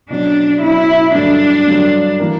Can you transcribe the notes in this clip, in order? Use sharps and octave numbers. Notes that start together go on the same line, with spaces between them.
B2 F#3 C#4 D4
B2 F#3 C#4 E4
G2 D3 F#3 D4
G2 D3 F#3
E3 A#3